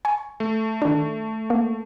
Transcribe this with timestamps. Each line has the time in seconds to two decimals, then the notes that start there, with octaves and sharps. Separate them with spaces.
0.05 G#5 C#6
0.40 A3
0.82 D#3 D4
1.50 A#3